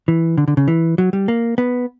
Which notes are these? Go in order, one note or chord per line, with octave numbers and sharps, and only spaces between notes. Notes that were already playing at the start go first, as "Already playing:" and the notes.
E3
D3
D3
C#3
E3
F#3
G3
A#3
B3